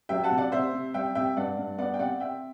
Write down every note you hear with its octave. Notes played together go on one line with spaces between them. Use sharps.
F#3 E5 G5
F#5 A5
C3
D5 F#5
C3 C5 E5
C3
G3 E5 G5
C3 E5 G5
G2 D5 F#5
G2
B3 D5 F#5
G5
C3 D5 F#5
C4 E5 G5